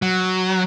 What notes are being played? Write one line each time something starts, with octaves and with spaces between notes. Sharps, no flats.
F#3